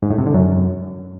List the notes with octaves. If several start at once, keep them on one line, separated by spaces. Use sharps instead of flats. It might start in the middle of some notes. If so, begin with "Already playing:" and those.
G#2
A2
C3
D3
F#2